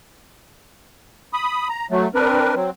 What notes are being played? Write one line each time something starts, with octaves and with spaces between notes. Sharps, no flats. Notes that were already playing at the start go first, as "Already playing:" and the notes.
B5 D#6
A#5
F#3 A3
C4 D4 A#4 B4
F#3 C4